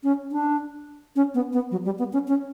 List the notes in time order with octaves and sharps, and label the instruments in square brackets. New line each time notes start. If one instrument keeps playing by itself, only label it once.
[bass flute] C#4
D4
C#4
B3
B3
F#3
G3
B3
C#4
C#4